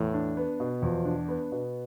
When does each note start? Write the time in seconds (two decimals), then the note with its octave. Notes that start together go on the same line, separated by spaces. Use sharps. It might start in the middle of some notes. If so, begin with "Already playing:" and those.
Already playing: E2 A2
0.14 D4
0.37 B3
0.60 B2
0.82 E2 F3
1.05 D4
1.29 B3
1.52 B2